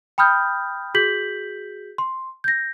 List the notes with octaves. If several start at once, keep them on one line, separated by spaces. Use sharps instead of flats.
G5 B5 D#6 F6 G6
F#4 G#4 G6 B6 F#7
C6
G6 A#6